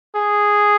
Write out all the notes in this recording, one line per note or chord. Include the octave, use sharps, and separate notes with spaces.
G#4